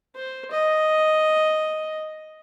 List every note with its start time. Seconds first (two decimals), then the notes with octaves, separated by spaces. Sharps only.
0.16 C5
0.51 D#5